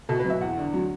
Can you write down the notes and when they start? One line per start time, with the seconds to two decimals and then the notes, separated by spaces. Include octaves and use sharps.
0.09 B2 A4
0.20 B4
0.24 F#3
0.30 E5
0.41 E2 F#5
0.57 D3
0.74 F#3